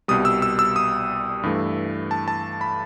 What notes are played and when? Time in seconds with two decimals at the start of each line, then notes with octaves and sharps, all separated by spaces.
0.08 C2 B2 G3 D#6
0.25 E6
0.42 E6
0.59 E6
0.76 D#6
1.43 G2 E3 A3
2.11 A5
2.28 A5
2.61 B5